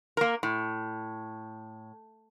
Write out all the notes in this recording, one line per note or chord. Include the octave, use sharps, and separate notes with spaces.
A#3 A#4
A2